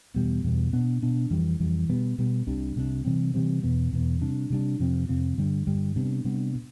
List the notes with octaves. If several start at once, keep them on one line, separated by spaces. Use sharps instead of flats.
E2 B2 G3 B3
E2 B2 G3 B3
B2 B3 D4
B2 B3 D4
F2 E3 G3
F2 E3 G3
B2 G3 B3
B2 G3 B3
C2 C3 G3 D4
C2 C3 G3 D4
C3 E3 G3 C4
C3 E3 G3 C4
E2 B2 B3
E2 B2 B3
C3 G3 D4
C3 G3 D4
F2 C3 F3 C4
F2 C3 F3 C4
G2 D3 G3
G2 D3 G3
C3 G3 B3 D4
C3 G3 B3 D4
B2